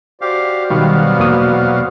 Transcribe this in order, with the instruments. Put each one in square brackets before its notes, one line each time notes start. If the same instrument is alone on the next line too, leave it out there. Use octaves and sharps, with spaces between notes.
[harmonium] F#4 C5 D5 [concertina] G4 F5
[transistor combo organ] B2 F#3 F5 [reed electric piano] D#3 G3 [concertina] B3
[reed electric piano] E2 A#3 D#6